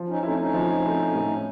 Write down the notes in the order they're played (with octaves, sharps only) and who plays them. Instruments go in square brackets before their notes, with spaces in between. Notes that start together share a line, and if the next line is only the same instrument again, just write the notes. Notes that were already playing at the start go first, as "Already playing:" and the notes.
Already playing: [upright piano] F3
[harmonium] C#4 D#4
[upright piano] A3 C4 E4 [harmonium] C#4 D#4
[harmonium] C#4 D#4
[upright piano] F3
A3 C4 E4
A2